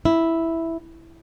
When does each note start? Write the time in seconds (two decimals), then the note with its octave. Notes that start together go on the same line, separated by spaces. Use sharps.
0.05 E4